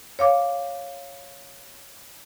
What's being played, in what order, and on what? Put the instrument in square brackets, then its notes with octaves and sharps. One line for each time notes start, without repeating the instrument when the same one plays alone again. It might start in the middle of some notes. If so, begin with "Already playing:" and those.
[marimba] C#5 F5 D6